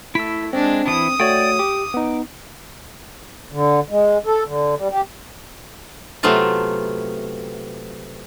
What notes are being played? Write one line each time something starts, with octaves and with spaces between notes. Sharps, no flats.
A3 E4 E6 B6
G#3 C4 D4
E3 E4 D#6
A3 F#4 C#5 D5 G5
G4 D6
B3 D#4
D3
G#3
A4
D3
G3
G4
C3 F#3 A3 B3 F4 A5